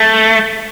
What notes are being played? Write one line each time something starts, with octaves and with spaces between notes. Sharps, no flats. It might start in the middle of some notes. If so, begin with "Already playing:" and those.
Already playing: A3